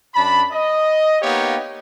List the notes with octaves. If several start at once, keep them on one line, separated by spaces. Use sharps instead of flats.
F#2 D4 A5 B5
D#5
A#3 B3 D#4 G4 C#5 F5